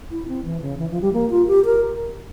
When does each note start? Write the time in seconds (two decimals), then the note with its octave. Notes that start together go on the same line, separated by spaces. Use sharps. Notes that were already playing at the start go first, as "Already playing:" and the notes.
0.11 E4
0.28 C4
0.45 E3
0.62 C#3
0.79 E3
0.91 F3
1.02 G3
1.13 A#3
1.30 F4
1.47 G4
1.65 A#4